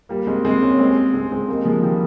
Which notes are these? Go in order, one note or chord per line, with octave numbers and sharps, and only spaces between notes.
G3 A#3
G#3 C4
G#3 C4
A#3 C#4
G#3 C4
G#3 C4
G#3 C4
G3 A#3
F3 G#3
D#3 G3